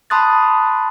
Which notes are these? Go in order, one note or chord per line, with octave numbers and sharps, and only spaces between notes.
A5 B5 C6 D#6 F#6 A6